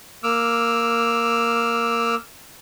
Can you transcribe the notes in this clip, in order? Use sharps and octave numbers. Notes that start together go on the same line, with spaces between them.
A#3 D6 E6 F6